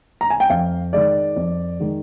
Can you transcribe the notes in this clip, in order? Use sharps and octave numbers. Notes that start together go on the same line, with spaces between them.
A#5
G#5
G5
F2 F5
D#3 G#3 D5
F2
D#3 G#3